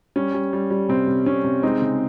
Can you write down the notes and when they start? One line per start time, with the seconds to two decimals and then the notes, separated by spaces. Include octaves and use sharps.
0.16 G3 C#4
0.34 G3
0.53 G3
0.70 G3
0.89 C3 C4
1.07 C3
1.26 C3 C#4
1.44 C3
1.63 G#3 C4 D#4
1.82 C#3